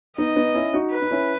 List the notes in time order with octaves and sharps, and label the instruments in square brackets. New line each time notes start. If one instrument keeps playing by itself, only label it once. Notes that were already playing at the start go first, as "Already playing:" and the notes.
[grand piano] B3 D#4 [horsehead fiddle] D#5
[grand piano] B3 D#4
C#4 E4
D#4 F#4
[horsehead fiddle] B4
[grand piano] D#4
C#4 E4